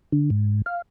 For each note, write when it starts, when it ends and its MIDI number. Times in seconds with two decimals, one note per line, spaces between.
0.12 0.30 50
0.30 0.62 44
0.66 0.82 77